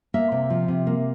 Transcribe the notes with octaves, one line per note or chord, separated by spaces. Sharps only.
A#3 E5
C3
F3
C3
A#3